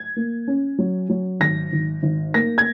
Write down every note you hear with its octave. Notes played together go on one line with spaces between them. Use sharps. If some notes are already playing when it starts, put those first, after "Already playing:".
Already playing: G#6
A#3
C#4
F#3
F#3
G#1 A#6
G#1
G#1
A#3 A#6
G#6